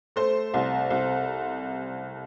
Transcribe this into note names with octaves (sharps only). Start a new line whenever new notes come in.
A3 C5
C2
C2